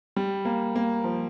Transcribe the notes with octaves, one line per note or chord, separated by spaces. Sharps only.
G3
A#3
A#3
F3